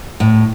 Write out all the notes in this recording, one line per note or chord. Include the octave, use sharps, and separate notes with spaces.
A2